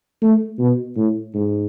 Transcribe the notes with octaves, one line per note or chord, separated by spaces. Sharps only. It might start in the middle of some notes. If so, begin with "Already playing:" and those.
A3
B2
A2
G#2